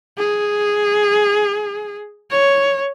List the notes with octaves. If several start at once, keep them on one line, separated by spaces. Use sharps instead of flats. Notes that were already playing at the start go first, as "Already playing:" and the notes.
G#4
C#5